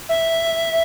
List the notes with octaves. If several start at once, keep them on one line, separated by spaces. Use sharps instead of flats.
E5